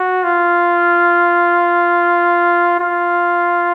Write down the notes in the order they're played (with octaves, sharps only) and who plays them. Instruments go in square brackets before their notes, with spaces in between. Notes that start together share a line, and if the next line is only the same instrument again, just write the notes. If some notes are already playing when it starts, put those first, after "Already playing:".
Already playing: [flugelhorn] F#4
F4
F4